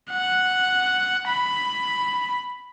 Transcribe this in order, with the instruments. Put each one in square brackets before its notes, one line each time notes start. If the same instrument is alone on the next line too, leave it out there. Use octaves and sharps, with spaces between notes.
[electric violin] F#5
B5